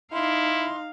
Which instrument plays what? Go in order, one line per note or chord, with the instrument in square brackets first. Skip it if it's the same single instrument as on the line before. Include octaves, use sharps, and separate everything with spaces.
[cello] D#4 [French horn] E4 [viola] F5 [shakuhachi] C6